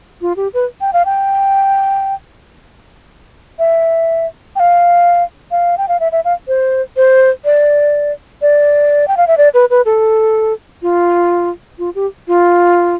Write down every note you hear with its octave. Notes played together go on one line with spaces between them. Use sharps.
F4
G4
B4
G5
F5
G5
E5
G5
F5
F5
G5
F5
E5
E5
F5
C5
C5
D5
D5
G5
F5
E5
D5
B4
B4
A4
F4
F4
G4
F4